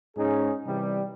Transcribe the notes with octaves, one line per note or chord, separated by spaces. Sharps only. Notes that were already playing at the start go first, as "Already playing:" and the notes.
G#2 C#4 D#4 G#4
C3 E3 G3